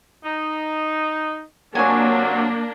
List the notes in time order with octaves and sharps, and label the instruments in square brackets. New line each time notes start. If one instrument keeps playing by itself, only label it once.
[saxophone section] D#4
[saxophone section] C3 F#3 [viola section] A#3 D4 [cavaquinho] C#5 G#5